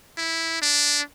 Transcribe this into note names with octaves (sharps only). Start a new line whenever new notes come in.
E4
D4